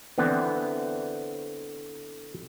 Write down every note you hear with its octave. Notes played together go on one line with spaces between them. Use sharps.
D3 E3 B3 C4